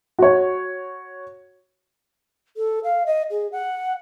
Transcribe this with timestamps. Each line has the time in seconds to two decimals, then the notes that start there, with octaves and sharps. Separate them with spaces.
0.19 F#4 C#5
2.57 A4
2.84 F5
3.06 D#5
3.30 G#4
3.52 F#5